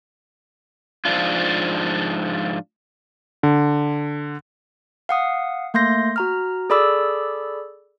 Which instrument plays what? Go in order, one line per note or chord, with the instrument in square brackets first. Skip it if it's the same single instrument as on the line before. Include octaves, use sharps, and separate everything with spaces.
[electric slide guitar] G#2 F3 D4 F4
[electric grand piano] D3
[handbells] F5 F#5 D#6
A3 A#3 C6 G6 A#6
F#4 A#5 F6
G#4 A4 D5 B5 D6 E6